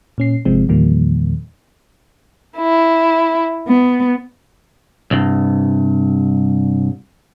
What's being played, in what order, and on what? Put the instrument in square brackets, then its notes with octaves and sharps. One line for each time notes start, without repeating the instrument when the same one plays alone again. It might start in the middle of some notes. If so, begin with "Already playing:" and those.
[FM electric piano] A#2 C#4 C7
G1 C3 F3 G#3 C4
E2 A#2 D#3 F3 G3 A#3
[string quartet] E4
B3
[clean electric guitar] C2 G2